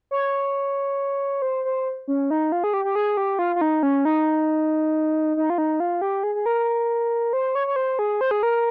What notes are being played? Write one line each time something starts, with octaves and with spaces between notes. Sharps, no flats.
C#5
C5
C5
C#4
D#4
F4
G#4
G4
G4
G#4
G4
F4
F4
D#4
C#4
D#4
D#4
F4
D#4
F4
G4
G#4
G#4
A#4
C5
C#5
C#5
C5
G#4
C5
G#4
A#4